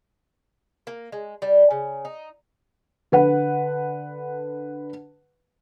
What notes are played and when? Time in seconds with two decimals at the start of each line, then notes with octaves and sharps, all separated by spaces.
0.87 A#3
1.12 G#3
1.42 G3
1.71 C#3
2.05 D#4
3.12 D3 B4 F#5